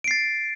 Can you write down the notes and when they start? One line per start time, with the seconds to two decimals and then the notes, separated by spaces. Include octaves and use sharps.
0.04 D7
0.08 C7
0.11 A6